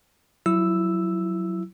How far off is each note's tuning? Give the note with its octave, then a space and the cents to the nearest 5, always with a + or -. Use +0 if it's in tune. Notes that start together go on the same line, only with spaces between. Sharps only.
F#3 +0 E4 +15 E6 +0